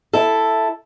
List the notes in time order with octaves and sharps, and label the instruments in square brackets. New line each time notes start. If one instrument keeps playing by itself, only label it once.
[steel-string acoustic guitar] E4 A4